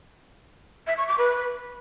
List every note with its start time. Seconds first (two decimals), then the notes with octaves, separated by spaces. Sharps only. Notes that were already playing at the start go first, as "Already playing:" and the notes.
0.87 E5
0.97 C#6
1.08 D6
1.18 B4